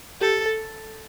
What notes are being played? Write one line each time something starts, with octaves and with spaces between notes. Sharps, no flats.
G4 A4
A4